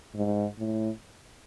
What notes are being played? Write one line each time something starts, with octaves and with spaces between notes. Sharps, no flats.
G#2
A2